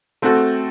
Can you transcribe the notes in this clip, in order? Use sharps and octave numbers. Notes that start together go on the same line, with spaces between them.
A3 C4 F#4 A4